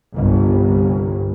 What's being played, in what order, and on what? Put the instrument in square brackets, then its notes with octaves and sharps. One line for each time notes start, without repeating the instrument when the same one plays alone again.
[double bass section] G1 C2